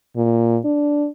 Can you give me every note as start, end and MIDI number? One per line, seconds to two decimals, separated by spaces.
0.16 0.59 46
0.65 1.08 62